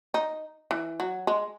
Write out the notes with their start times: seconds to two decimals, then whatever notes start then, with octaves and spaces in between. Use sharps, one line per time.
0.14 D#4
0.71 E3
1.00 F#3
1.27 G#3